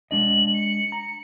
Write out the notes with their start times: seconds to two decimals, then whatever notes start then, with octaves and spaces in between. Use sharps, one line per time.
0.11 G#3 D4 D#5 F#7
0.54 C#7
0.92 A#5